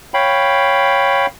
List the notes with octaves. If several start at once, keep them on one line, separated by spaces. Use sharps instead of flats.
C#5 F5 G5 B5